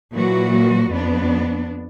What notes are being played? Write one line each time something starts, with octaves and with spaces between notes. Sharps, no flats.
A#2 E3 F#3 F#4
F2 B3 D4